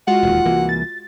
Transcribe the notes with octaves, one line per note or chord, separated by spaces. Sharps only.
G#3 F4 F#4 F#5
E1 D#2
C2 E3 A#3
A6